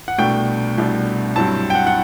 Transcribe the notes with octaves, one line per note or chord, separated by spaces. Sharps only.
F#5
C2 B2 A3 D4 G5
C2 B2 A3 D4
G2 F#3 C4 E4 A5
G5
F#5
F#5